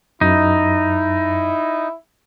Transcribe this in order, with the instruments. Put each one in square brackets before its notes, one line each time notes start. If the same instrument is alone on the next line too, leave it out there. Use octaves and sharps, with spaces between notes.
[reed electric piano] F#2 [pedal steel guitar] D#4 [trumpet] E4